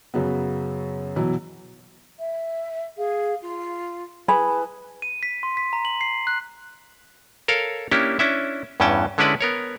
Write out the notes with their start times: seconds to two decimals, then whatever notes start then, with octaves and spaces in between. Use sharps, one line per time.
0.14 F#2 C#3 F#3 B3
1.16 B2 E3 F#3
2.18 E5
2.97 G#4 F5
3.42 F4
4.28 E4 G#4 B4 A5 B5
5.02 D#7
5.23 B6
5.43 C6
5.57 B6
5.73 A#5
5.85 F#7
6.01 C7
6.27 F#6
7.48 A4 A#4 C#5 F5
7.91 A#3 C#4 D4 E4 G4
8.19 C#4 D4 E4 E5
8.80 E2 G2 E3 C#4 G5 A5
9.18 D3 G#3 C#4 E4 B4 D5
9.41 B3 A#4 C#5